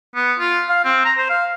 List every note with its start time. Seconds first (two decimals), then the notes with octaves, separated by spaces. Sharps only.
0.15 B3
0.39 F4
0.69 F5
0.84 C4
1.05 A#5
1.18 C5
1.30 F5